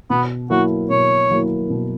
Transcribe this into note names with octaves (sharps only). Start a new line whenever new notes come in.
B2 B3
F#3 A#3 E4 F#4 A#4
B2 C#5
F#3 A#3 E4 A#4
B2